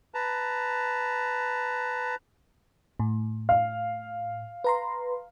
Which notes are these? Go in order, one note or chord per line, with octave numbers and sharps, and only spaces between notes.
B4 A5 A#5
A2
F5
B4 A#5 C6